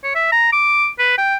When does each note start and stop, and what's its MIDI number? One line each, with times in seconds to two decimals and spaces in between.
0.04 0.13 73
0.15 0.30 76
0.32 0.50 82
0.53 0.88 86
0.99 1.14 71
1.18 1.37 79